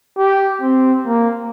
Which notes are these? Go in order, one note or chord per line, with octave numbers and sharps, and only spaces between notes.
G4
C4
A#3